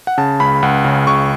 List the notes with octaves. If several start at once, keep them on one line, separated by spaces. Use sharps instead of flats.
F#5
C#3 A5
C#2 B5
C#2 F#5
C#3
C#2 C#6